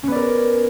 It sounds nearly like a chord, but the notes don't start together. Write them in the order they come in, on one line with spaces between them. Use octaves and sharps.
C#4 B3 D5 A#4